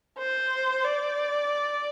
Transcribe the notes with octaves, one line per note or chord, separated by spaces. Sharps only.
C5
D5